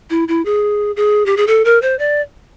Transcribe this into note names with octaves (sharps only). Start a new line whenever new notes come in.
E4
E4
G#4
G#4
G4
G#4
A4
A#4
C5
D5